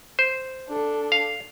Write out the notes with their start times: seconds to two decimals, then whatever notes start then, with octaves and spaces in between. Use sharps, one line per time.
0.19 C5
0.68 D4 A4
1.12 F5